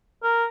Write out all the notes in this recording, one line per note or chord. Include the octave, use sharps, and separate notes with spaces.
A#4